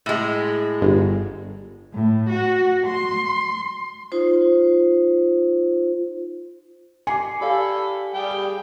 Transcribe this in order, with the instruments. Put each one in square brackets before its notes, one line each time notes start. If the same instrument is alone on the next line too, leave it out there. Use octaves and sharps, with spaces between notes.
[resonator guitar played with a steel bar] A2 G#3
[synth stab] G1
[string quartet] A2
F#4
C6
[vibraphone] D#4 F4 C5
[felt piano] G#5 [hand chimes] D6 C7 C#7
[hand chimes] G4 D5 F5 [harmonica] A4 B5
[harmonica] G3 G#4 G5